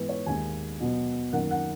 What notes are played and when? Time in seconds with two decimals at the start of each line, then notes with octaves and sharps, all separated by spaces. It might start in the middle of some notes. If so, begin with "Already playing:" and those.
Already playing: G#2 E3 G#3 B3 B4
0.09 C#5
0.26 D#2 D#3 G#3 G#5
0.80 B2 F#3 B3
1.33 F#2 D#3 A#3 F#5
1.51 F#5